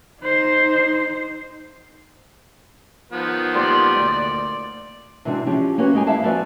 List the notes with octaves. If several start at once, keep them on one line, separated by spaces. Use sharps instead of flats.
D#4 C5
D#3 F3 B3
A#2 G3 C5 D5
D2 A#2
C3 E3 G#3 C4 D4 F#4
F3 C#4 G4 G#4
A#3 C#4 F4 F#4 B4
G#3 D#4 G4 G#5
D#2 E4 E5 F5 A5
F3 A3 B3 F#4 D5 G#5